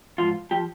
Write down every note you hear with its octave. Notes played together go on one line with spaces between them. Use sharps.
G#2 F3 F4
F3 G4